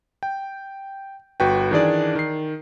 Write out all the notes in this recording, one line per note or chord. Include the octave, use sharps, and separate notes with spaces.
G5
G1 F#4 B4 G5
D#3 E3 D4 G#4 D5
D#3 C7